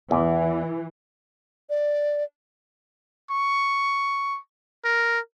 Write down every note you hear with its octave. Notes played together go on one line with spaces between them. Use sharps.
E2 E3
D5
C#6
A#4